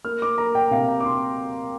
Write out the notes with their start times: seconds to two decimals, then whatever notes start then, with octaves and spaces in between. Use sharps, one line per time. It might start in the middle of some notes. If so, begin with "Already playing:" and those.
0.04 A#3 F6
0.22 D6
0.38 A#3 A#5
0.55 G5
0.71 C3 F5
0.88 A#5
1.00 D6
1.04 C3 C6